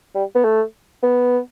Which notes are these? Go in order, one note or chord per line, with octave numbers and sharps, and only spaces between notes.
G3
B3
A3
B3